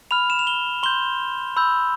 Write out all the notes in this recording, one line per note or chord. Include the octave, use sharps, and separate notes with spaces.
B5 F6 F7
E7
F7
G7
C6 G6 G7
B5 E6 G6